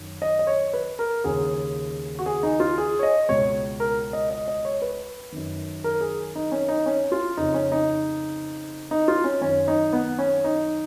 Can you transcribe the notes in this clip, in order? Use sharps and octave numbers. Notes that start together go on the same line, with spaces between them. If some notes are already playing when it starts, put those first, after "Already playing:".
Already playing: F#2 D#3
D#5
D#5
C#5
B4
A#4
D#2 C#3 G#4
F#4
G#4
D#4
F4
G#4
C#5
D#5
C#2 B2 C#5
A#4
D#5
D#5
D#5
C#5
B4
F#2 D#3
A#4
G#4
D#4
C#4
D#4
C#4
F4
F2 C#3 D#4
C#4
D#4
D#4
F4
C#4
F#2 D#3 C#4
D#4
B3
C#4
D#4